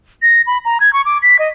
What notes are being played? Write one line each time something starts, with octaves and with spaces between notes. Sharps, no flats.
A#6
B5
A#5
G#6
C#6
D6
B6
D#5